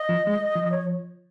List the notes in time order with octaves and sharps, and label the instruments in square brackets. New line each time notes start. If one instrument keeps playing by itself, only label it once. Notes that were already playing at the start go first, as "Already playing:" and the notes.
Already playing: [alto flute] D#5
[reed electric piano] F3
G#3
F3
[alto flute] C#5